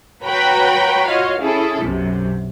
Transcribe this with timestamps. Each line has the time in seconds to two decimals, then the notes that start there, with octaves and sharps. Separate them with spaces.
0.23 F#4 B4 C#5 G5 A#5 B5
1.07 F4 F#4 C#5 D#5 F5
1.40 C#4 E4 G#4 A4
1.83 B1 F#2 C3